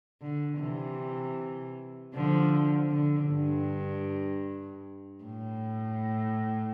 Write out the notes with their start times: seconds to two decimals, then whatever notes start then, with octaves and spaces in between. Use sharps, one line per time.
0.21 D3
0.59 C3 E3
2.14 D3 F3
2.92 D3
3.31 G2
5.25 A2